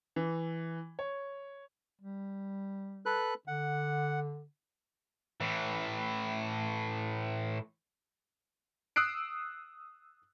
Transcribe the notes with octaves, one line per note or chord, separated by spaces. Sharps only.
E3
C#5
G3
A4 B4 F#6
D3 F#5
A2 E3
D#6 E6 F#6 C7 D7